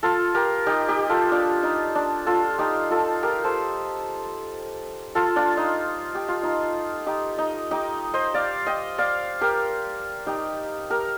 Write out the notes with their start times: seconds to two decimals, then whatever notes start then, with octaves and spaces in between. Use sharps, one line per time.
0.03 F4 A4
0.34 G4 A#4
0.66 D#4 G4
0.88 D#4 G4
1.09 F4 A4
1.31 D4 F4
1.63 D#4
1.95 D4
2.26 F4 A4
2.58 D#4 G4
2.90 F4 A4
3.23 G4 A#4
3.44 A4 C5
5.15 F4 A4
5.36 D4 F4
5.57 D#4
6.15 G4
6.28 F4
6.43 D#4
7.06 D#4 G4
7.38 D#4
7.71 D#4 G4
8.14 C5 D#5
8.34 D5 F5
8.66 D#5 G5
8.98 D5 F5
9.41 G4 A#4
10.27 D#4 G4
10.90 G4 A#4